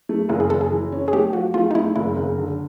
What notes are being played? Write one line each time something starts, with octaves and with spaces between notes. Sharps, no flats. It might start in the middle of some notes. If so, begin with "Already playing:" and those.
A3
F#1 E4
G#4
F#1 A4
G#4
E3
C#4
G#4
A3 G4
F3 F#4
A3 F4
D#4
A3 E4
F#1 E4
F#1
D3